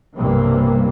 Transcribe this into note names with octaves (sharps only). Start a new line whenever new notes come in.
B1 G2 C3 E3 G3 A#3